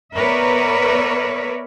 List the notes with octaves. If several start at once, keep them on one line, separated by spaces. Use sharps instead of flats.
B3 A#4 B4 C#5 D5 E5